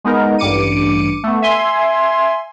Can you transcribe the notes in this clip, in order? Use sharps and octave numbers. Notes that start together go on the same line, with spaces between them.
G#3 B3 D#4 A#4
A1 G2 D6 C#7 D#7
A3 B3
E5 G#5 C6